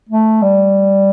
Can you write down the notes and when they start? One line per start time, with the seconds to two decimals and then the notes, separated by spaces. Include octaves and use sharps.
0.09 A3
0.42 G3